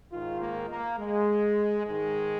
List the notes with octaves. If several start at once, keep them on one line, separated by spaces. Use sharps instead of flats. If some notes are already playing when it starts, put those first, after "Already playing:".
G#2 D#3 F4
A#3
A#3
G#3
G#2 D#3 G#3